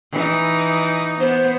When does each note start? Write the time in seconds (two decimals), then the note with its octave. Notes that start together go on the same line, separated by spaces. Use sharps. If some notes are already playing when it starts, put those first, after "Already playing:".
0.12 E3 D#4
1.20 B3 C5